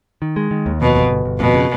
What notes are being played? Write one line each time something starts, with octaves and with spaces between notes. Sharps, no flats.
D#3
G#3
D#3
D#2
F2 B2
G1
G1
G1
F2 B2
C#3